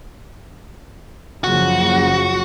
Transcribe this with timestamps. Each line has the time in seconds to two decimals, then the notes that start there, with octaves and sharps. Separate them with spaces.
1.44 F#1 C#3 F3 F#4